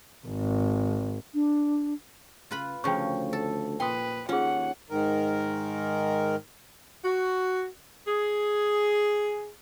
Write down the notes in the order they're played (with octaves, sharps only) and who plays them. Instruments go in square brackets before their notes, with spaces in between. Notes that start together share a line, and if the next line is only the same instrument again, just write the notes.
[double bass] G#1
[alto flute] D4
[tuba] C#3 [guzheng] F4 B4 B5
[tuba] D2 [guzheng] C#3 F3 [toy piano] G5 C#6
[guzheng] A4
[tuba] A#2 [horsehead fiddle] B4 [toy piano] G5 D#6 [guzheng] C6
[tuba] D#2 [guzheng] C#4 [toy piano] F4 G#4 [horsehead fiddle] F#5
[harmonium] G#2 D#3 A#4
[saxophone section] F#4
G#4